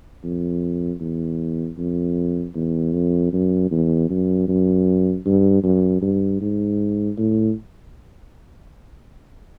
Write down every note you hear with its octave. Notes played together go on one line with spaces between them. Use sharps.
F2
E2
F2
E2
F2
F#2
E2
F#2
F#2
G2
F#2
G2
G#2
A2